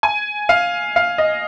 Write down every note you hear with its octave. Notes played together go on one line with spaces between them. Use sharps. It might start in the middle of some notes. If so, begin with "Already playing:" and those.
G#5
F5
F5
D#5